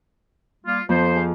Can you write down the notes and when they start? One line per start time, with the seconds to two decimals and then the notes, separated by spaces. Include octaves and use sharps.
0.65 G3 A#3 F4
0.89 F2 B3 A4 C5
1.16 G#4 F5